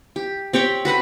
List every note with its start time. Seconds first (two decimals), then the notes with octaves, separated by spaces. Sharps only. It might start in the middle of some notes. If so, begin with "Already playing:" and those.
0.16 G4
0.53 C4 G4 C#5 G5
0.85 F#4 B4 F#5 B5